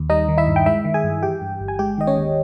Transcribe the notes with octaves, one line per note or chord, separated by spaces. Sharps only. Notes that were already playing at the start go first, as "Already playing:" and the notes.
Already playing: D#2
G3 D#4 D#5
D#3
E4 E5
G2
G5
G#3 E4 E5
D#3
G#4 G#5
G2
E3 G4 G5
G2
G1
G#5
G#3 G4 G5
D#3 D#5
C#4 C#5
D#2